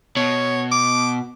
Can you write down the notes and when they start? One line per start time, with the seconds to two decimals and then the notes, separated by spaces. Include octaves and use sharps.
0.17 B2 C#5
0.72 D6